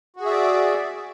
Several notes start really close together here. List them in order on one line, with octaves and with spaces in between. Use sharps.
F#4 G#4 E5 D5